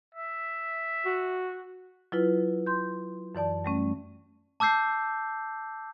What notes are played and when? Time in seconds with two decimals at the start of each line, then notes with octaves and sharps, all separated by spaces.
0.15 E5
1.05 F#4
2.12 F#3 E4 F4 B4
2.66 C6 G6
3.35 F#2 E3 D5 A5
3.65 G3 A3 C#4
4.60 A5 D6 E6 G6 C7